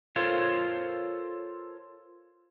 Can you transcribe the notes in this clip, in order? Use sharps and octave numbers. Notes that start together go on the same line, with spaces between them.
F4 A4 A#4 C5 C#5 F5